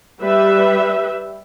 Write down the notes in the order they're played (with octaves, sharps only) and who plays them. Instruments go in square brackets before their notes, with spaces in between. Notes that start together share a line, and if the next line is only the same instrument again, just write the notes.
[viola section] G3 B4 E5